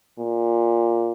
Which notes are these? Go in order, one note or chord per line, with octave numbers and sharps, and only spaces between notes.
A#2